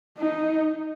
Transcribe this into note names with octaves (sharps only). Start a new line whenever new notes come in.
D#4